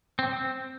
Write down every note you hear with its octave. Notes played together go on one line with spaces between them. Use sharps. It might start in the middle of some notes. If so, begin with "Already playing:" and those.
C4
C4